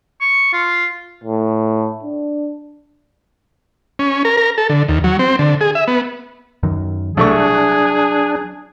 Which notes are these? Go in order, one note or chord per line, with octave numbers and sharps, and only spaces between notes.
C#6
F4
A2
D4
C#4
A#4
A#4
A4
D3
D#2
F#3
C4
D3
G#4
E5
B3
F#2 D#3
C2 F#3 A3 D4 G#4 C#6